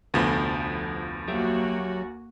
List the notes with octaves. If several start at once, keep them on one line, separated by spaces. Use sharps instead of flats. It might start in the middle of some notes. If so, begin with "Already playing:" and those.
F1 D2 F3 B3
F#3 A#3 F#4 G4 E5